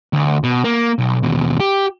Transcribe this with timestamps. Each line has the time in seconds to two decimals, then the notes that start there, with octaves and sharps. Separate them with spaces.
0.13 D2
0.44 B2
0.64 A#3
0.98 B1
1.23 D#2 B2
1.60 G4